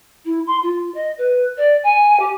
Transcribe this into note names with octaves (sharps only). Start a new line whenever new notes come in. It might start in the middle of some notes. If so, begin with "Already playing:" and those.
E4
C6
F4
D#5
B4
D5
G#5
G4